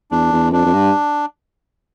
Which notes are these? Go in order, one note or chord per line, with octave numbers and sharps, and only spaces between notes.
E2 D4
E2
F2 D4
F2
G2